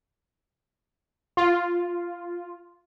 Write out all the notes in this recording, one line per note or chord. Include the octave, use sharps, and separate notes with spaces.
F4